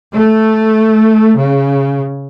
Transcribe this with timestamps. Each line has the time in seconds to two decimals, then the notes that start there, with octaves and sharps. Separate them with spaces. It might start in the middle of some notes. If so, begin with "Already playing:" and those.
0.16 A3
1.38 C#3